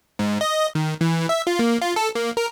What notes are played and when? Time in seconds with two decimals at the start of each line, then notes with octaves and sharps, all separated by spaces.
0.19 G#2
0.41 D#5
0.75 D#3
1.01 E3
1.29 E5
1.47 F4
1.59 A#3
1.82 F4
1.96 A4
2.15 A#3
2.37 A#4